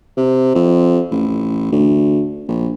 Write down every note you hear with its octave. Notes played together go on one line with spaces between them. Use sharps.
C3
F2
A1
D2
A#1